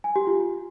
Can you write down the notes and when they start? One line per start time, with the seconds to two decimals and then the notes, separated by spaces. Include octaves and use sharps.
0.04 G#5
0.16 G4
0.27 F4